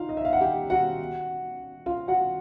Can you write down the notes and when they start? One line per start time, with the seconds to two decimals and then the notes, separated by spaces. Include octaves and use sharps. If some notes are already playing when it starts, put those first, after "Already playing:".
Already playing: D#4 F4 F5
0.09 D#5
0.17 E5
0.25 F5
0.33 F#5
0.41 G4 G5
0.70 F#4 F#5
1.86 F4 F5
2.08 F#4 F#5